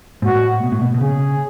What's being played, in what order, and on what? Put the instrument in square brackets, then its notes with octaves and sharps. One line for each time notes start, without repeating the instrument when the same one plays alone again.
[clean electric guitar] G#2
[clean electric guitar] A2 [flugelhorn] F#4
[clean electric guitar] B2
A2
B2
B2
[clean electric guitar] C#3 [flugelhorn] G#4